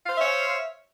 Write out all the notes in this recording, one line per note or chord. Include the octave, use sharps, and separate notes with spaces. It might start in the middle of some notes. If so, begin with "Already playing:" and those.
C5 C#5 E5 F5